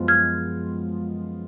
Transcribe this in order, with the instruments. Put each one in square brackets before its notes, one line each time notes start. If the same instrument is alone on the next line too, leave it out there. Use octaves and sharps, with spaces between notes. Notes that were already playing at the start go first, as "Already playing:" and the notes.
Already playing: [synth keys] F#2 F3 G#3 B3 F4
[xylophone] F6 G#6